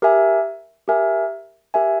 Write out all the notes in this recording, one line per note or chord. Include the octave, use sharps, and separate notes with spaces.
G4 A#4 E5 G#5
G4 A#4 E5 G#5
G4 A#4 E5 G#5